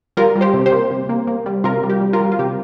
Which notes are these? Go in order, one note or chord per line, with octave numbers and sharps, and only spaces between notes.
G3 F4 A#4
G3
G4 C5
C3
G4 C5
A#3
C3
A#3
A#3
G3
C3 F4 A#4
G3
G4
G3
F4 A#4
G3
F4
C3 G4